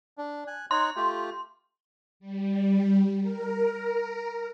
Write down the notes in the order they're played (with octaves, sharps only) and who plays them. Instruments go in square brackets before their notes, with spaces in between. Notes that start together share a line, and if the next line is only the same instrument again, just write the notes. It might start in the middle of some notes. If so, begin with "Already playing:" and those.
[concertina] D4
G#5 F#6
[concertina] D#4 C#5 F#6 [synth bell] C6
[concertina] A3 F4 G4
[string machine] G3
A#4